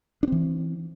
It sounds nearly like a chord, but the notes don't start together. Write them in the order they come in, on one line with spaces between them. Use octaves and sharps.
D4 C4 E3